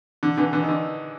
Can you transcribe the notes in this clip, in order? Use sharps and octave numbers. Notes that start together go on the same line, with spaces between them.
D3
D3 E3
D3 E3
D#3
D3